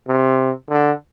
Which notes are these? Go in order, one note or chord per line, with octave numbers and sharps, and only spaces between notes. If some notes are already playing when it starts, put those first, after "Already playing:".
C3
D3